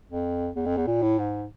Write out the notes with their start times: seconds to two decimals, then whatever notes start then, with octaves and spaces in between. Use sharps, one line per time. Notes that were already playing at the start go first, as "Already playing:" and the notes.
0.09 F2
0.56 E2
0.66 F2
0.77 E2
0.87 A#2
1.02 A2
1.19 G#2